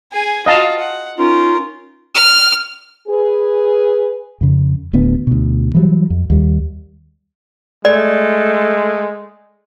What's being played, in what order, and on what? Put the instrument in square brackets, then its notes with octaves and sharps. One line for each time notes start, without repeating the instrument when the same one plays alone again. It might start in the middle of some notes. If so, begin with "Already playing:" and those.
[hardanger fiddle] G#4 G#5
[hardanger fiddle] F4 F#4 [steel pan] D#5 F5 A5
[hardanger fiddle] F#5
[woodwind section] C#4 D#4 F4 [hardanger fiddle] A#4
[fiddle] F6
[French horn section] G#4 B4
[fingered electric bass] F2 C#3
D1 D2 B3
D2 B2
E3 F#3 G3
F2
D#2 G3
[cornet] G#3 [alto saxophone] A3 [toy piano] D5